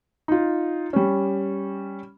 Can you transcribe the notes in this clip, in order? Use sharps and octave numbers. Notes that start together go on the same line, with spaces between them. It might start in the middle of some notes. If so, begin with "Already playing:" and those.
D#4 F4
G3 C#4